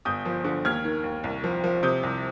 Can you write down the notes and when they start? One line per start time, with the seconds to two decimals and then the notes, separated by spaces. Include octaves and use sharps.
0.05 G1 D#6 G6
0.25 F3
0.44 D3
0.65 D#2 F6 G#6
0.84 D#3
1.04 D#2
1.24 C2
1.44 F3
1.64 F3
1.83 C3 D#6 G6
2.03 C2